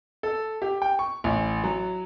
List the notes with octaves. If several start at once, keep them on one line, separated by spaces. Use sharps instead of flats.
A4
G4
G5
C#6
A1
F#3